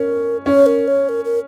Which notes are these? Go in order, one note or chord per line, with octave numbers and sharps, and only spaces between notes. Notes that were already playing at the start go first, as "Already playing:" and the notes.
Already playing: C#4 A#4
C#4 C#5
A#4
C#5
A#4
A#4